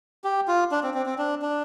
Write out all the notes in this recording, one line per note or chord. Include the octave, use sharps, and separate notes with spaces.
G4
F4
D4
C4
C4
C4
D4
D4